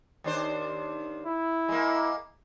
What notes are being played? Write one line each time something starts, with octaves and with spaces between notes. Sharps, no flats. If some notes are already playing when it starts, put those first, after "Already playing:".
D#2 D4 C5
E4
G#3 A#3